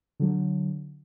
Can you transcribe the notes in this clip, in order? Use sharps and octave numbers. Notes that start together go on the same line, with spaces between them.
D3 F#3